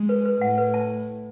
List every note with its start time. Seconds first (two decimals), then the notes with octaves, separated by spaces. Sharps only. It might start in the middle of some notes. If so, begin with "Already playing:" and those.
Already playing: G#3
0.09 B4
0.25 B4
0.41 A2 F#5
0.58 B4
0.74 A5